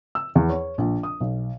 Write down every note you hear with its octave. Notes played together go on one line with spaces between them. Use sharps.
E6
E2
C#5
A#1
D#6
B1